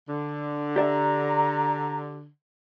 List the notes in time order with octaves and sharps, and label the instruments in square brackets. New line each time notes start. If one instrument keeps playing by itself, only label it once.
[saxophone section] D3
[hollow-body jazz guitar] G4 D5 E5 [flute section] A#5